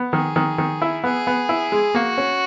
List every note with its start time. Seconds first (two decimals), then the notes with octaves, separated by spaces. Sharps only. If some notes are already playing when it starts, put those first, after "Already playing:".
Already playing: B3
0.13 D#3 G#4
0.36 D#3
0.58 D#3
0.82 E4
1.04 B3 G#4
1.27 B3
1.49 E4
1.72 G#3
1.95 A#3 F#4
2.18 C#4